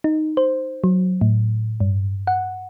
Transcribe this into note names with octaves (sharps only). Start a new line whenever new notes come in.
D#4
C5
F#3
A2
G2
F#5